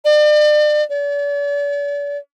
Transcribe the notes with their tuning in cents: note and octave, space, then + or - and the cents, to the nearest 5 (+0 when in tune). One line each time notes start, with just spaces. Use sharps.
D5 +40
D5 -40